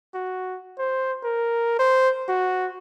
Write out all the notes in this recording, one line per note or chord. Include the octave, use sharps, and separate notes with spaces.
F#4
C5
A#4
C5
F#4